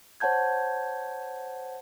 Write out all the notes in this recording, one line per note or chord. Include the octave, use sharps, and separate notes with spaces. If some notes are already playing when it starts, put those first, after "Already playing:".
C5 C#5 F#5 A5 G6 G#6